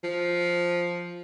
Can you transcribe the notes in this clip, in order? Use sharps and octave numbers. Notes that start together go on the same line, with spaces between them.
F3